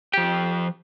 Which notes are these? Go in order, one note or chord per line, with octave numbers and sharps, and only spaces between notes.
F3 G4 G5